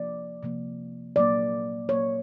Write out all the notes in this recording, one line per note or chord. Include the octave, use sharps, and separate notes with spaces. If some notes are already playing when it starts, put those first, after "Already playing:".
Already playing: C3 F3 A#3 D5
C3 F3 A#3
A#2 F#3 A#3 D5
A#2 F#3 A#3 C#5